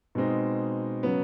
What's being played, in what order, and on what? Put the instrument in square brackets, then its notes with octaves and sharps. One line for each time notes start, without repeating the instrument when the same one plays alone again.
[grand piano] B2 G#3 C4 D#4
C#3 F#3 B3